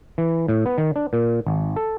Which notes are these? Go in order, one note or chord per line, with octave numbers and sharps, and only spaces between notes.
E3
A2
B3
D#3
D4
A#2
G#1
A4